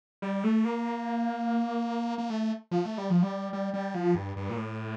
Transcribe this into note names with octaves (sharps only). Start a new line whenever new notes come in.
G3
A3
A#3
A#3
A3
F3
A3
G3
F3
G3
G3
G3
F3
G2
G2
A#2
A2